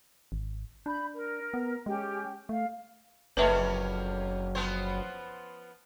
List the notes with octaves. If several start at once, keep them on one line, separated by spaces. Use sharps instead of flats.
G#1
D4 B5 G6
A#4
B3
G#3 C#4 G4 G5
A3 F5
F#1 F2 A#3 C#4 B4 E5 A#5
F3 B3 C5